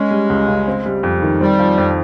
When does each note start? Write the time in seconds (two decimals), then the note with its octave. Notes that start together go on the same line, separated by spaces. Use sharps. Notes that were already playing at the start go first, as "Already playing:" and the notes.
Already playing: G#3 C#4
0.11 G3
0.30 C#2
0.48 C#3
0.67 C4
0.86 G3
1.03 F2
1.22 D#3
1.40 G3 C4
1.59 F3
1.78 F2